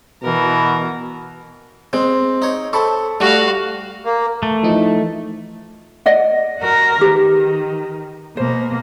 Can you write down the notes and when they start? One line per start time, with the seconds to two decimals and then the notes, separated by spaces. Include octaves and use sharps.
0.23 B2 E3 A#4
1.93 G#3 C4
2.42 D#4 C#5
2.73 C4 A4 A5 B5 C#6
3.20 G3 A3 F#4 F5
4.05 A#3
4.43 A3
4.63 E3 F3 D#4
6.06 D5 D#5 F#5
6.60 F#4 A#4
7.01 D#3 G4 B4
8.37 B2 A#3 C5